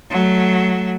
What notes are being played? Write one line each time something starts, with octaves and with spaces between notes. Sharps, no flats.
F#3 A3